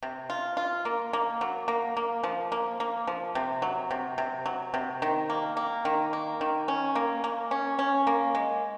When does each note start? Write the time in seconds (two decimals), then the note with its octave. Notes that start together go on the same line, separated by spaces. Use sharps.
0.03 C3
0.30 F4
0.57 F4
0.85 A#3
1.13 A#3
1.41 F#3
1.68 A#3
1.97 A#3
2.23 F3
2.52 A#3
2.80 A#3
3.07 F3
3.35 C3
3.62 F#3
3.91 C3
4.18 C3
4.46 F#3
4.74 C3
5.02 D#3
5.30 A#3
5.57 A#3
5.85 D#3
6.13 A#3
6.41 D#3
6.68 C#4
6.95 A#3
7.24 A#3
7.51 C#4
7.79 C#4
8.07 A#3
8.35 G#3